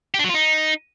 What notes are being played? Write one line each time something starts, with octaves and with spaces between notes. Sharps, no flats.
G4
D4
F#3
F4
D#4